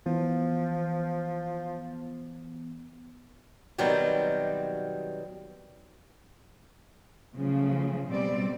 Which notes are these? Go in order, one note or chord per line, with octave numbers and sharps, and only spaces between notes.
E3 F3 B3
B2 D#3 F#3 G3 C4
C#3 F3 F#3 A3
B2 G3 C4 D5